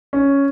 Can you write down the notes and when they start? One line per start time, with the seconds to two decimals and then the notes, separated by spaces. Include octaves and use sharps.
0.13 C#4